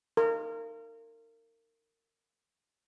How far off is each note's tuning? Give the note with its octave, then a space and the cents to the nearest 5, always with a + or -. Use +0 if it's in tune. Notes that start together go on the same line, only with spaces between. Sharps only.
A#4 -30